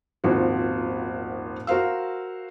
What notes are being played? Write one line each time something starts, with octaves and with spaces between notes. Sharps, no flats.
D#1 G#1 F3 F#4
F#4 A#4 C5 F5 E6